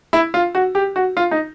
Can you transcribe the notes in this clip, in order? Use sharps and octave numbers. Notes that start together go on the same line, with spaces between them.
E4
F4
F#4
G4
F#4
F4
D#4